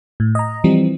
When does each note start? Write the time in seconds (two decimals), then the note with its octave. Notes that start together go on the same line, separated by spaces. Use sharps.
0.20 A2
0.35 D#5 A#5
0.64 E3 F3 G3 C4